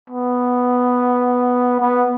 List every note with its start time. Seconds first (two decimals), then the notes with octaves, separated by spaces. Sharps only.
0.10 B3
1.80 B3